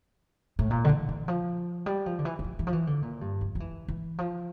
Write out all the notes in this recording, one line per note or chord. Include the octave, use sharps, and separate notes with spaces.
A2
A#2
D3
E3
E3
F3
G3
F3
D3
E3
E3
F3
E3
F3
E3
D3
A#2
G2
F2
F3
E3
E3
F3